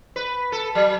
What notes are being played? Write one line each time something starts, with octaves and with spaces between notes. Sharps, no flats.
B4
A4
F#3